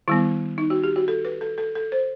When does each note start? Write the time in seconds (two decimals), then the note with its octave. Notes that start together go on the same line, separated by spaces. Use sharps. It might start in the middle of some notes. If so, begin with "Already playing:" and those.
0.08 D#3 G3 B3 E4
0.58 D#4
0.70 F#4
0.84 G4
0.96 F#4
1.08 A4
1.25 B4
1.41 A4
1.58 A4
1.75 A4
1.92 C5